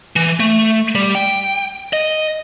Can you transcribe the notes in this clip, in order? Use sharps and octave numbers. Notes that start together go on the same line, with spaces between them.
E3
A3
G3
G5
D#5